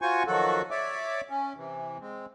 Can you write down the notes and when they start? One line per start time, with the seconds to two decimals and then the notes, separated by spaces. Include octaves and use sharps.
0.02 F4 F#4 C5 G#5 C#6
0.27 D#3 F3 F#3 F#4 A4
0.71 C#5 D5 E5 D6
1.30 C#4
1.57 C3 E3
2.01 G#3 C4